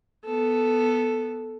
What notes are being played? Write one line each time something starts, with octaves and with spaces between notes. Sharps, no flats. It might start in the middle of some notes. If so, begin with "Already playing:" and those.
B3 A4